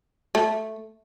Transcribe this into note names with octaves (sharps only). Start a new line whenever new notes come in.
A3